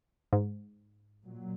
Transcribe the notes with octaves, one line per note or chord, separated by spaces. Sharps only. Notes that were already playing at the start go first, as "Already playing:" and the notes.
G#2
A#2 F#3